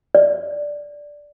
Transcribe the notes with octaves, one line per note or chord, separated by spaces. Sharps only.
D5